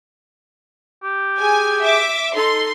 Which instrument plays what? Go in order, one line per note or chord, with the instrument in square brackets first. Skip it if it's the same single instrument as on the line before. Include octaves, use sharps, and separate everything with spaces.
[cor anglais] G4
[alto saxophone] G#4 [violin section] G#5
[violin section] E5 D6
[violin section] D#4 C6 [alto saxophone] A4